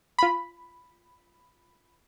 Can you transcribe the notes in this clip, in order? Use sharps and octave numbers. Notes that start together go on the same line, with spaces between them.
F4 B5